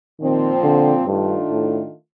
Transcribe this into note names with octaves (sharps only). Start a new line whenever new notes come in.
A#2 D#3 F3 C4
D3
G2 D#3 A3 D4 F4
A2